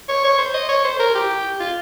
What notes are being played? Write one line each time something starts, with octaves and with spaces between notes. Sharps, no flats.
C#5
C#5
C5
D#5
C#5
C5
A#4
G4
F4